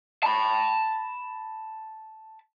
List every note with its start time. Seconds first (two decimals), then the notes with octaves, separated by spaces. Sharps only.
0.23 A5 B5